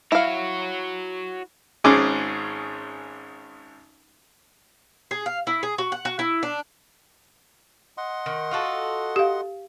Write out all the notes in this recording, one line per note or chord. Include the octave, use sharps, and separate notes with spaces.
E4 F#4 C#5 F5
G#1 G#2 C#4 G#4 D6
G#4
F5
E4
G#4
F#4
F#5
F#4
E4
D4
D#5 F#5 C6
D#3
F4 F#4 A4
G4 F5